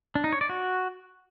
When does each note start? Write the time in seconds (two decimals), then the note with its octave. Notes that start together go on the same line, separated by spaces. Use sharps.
0.15 D4
0.24 D#4
0.32 C#5
0.41 D5
0.49 F#4